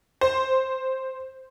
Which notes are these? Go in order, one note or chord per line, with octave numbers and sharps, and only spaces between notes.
C5